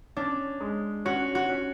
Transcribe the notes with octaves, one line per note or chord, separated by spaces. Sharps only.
C#4 D4
G#3
C#4 F#4
F#4
C#4